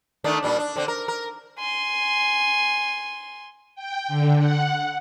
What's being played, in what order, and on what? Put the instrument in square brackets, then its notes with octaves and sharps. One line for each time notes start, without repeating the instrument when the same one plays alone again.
[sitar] D#3 A3 D4
A#2 G3 D4
D4
D3 C4 D4
A#4
A#4
[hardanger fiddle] G#5 C6
[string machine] G5
D3
F#5